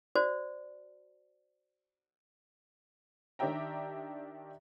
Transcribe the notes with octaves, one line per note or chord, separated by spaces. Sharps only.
F#4 C5 D5
D#3 D4 G4 E5 G5 A#5